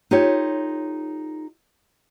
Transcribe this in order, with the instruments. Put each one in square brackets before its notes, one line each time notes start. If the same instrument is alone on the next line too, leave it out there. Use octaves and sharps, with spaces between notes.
[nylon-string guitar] D#4 F4 G4 A4 C#5